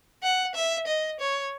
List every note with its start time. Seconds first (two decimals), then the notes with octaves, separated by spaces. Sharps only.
0.23 F#5
0.55 E5
0.87 D#5
1.20 C#5